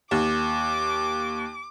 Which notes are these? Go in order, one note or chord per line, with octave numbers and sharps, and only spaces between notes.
D#2 D6